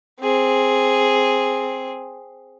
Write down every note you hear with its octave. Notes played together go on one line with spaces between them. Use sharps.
C4 G#4